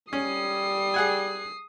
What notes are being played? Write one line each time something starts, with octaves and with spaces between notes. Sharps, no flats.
G3 C#4 D#6 C7
G#4 F#5 G#5